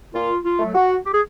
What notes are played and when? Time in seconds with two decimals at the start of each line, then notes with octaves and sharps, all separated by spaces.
0.14 A#2 F4
0.44 F4
0.59 F#3 A3
0.74 F#4
1.04 G4
1.13 G#4